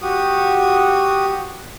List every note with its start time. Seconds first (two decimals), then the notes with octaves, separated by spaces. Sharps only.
0.02 F#4 G4 D#6